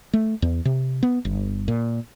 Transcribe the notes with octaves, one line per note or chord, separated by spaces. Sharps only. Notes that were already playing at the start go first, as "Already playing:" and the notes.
A3
E2
C3
B3
G1
A#2